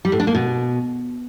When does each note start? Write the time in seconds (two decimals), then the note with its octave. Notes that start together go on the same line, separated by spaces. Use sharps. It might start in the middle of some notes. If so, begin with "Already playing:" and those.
0.05 G3
0.12 A2
0.20 D4
0.27 A#3
0.35 B2